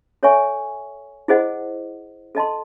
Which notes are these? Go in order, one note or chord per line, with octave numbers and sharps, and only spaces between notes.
A4 C#5 E5 G#5 C#6
E4 G#4 C5 D#5 F#5
A4 D#5 A5 C6